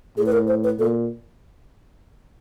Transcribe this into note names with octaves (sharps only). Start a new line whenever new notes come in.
A2 G#4
B4
A#4
C5
B4
A#2 A4